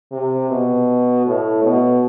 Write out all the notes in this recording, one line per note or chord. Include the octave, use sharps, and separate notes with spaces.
C3
B2
A2
B2